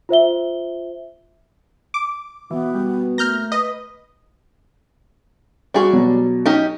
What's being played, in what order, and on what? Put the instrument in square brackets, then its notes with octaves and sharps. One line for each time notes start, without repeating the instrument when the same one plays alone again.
[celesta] F4 C5 E5 G7
[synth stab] D6
[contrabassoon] B2 [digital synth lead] E3 [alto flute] B3
[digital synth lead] G3
[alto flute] A3 [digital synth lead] A#3 [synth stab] F6 G6 A#6
[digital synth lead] B4 [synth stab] D#5
[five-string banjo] G3 G#4 [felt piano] F#4 C#6
[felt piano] B2 F#3
[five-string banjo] C#4 D#4 G4